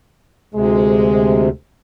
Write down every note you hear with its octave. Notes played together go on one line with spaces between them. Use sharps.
D2 C3 G#3